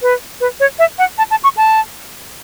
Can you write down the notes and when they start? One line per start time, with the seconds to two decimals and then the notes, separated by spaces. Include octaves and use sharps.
0.02 B4
0.41 B4
0.60 C#5
0.79 E5
0.98 F#5
1.18 A5
1.31 A5
1.44 C#6
1.57 A5